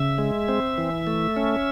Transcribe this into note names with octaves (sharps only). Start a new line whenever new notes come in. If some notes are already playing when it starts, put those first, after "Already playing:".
Already playing: C#3 E5
G#3
C4
E3
A3
C#4